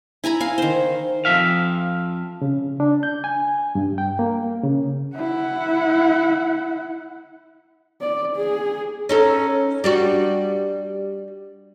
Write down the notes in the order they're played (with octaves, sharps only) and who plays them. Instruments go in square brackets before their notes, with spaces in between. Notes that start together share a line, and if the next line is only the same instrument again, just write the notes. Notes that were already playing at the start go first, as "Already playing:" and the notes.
[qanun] E4 G#5 A#5 B5
F5 G#5
D#3 C5
[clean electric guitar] F2 E3 F3 E5 F5
[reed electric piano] C#3
D4
G6
G#5
G2
G5
A#3
C#3
[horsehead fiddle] E4 F#5
D5
G#4
[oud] C#4 D#4 A4
G3 D4 F#4